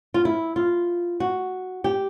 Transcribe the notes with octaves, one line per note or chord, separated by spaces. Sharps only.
F4
E4
F4
F#4
G4